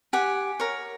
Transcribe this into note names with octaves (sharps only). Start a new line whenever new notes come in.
G4 F#5 G#5
A#4 C#5